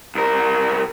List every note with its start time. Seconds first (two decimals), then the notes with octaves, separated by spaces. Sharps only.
0.15 C2 A#4